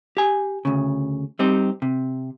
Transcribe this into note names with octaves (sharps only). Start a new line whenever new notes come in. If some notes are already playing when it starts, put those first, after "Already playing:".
G4 G#5
D2 C#3
G3 C4 D#4 G4
C3